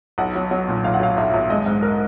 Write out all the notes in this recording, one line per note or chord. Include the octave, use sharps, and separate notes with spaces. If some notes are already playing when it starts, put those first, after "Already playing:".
B1 F#5
F#3
F#3
A#2
B1 F5
F#5
F#3 F5
B1 E5
B1
G#3 D#5
G#2
A#4